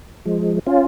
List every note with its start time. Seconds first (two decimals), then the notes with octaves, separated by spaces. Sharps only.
0.25 F3 G#3
0.67 C#4 F4